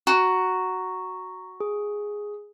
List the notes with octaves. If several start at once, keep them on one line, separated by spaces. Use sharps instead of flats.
F#4 A#5
G#4